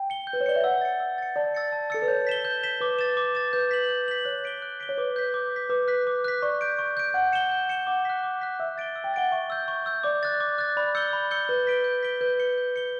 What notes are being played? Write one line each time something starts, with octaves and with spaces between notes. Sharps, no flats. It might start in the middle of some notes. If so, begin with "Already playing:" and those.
Already playing: G5
C#7 G7
G6
B4
C#5
D5 C#7 G7
E5
F#5 E6
A6 C#7
E6
A6 C#7
D5 A5
E6 A6 C#7
A5
A4 E6 A6 C#7
B4
C#5 G6
B6 E7 G7
G6
B6 E7 G7
B4 D6
A6 E7
D6
A6 E7
B4 G6
B6 F#7
G6
B6 F#7
C#5 F#6
B6 D7 G7
F#6
B6 D7 G7
C#5
B4 D6
G6 B6
D6
G6 B6
B4 D6
F#6 B6
D6
F#6 B6
D5 C#6
G6 D7
C#6
G6 D7
F#5 G6
C#7 E7 G7
G6
C#7 E7 G7
F#5 D6
F#6 B6
D6
F#6 B6
E5 E6
A6 D7 G7
E6
G5
F#5 A6 D7 G7
E5 C#6
E6 G6
C#6
E6 G6
D5 D6
F#6 A6
D6
F#6 A6
D5 B5
E6 G6 C#7 G7
B5
E6 G6 C#7 G7
B4 G6
B6 D7 G7
G6
B6 D7 G7
B4 G6
C#7 G7
G6
C#7 G7